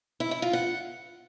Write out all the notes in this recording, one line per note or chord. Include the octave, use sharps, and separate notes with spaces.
E4
E4
F4
F#5